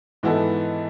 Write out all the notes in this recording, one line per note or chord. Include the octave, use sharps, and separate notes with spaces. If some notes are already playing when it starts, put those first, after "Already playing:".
G#2 E3 B3 E4 A4